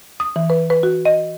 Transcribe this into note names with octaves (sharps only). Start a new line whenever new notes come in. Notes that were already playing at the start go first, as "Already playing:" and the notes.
D#6
E3
B4
B4
F#4
D#5